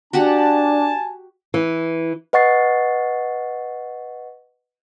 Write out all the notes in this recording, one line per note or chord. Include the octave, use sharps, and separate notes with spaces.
D4 F#4 G4 F#5 G#5 A5
E3
B4 D#5 F#5 C#6 A6 C7